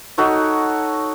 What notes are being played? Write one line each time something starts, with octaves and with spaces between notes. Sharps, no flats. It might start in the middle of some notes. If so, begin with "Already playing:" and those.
D#4 F#4 A4 C#5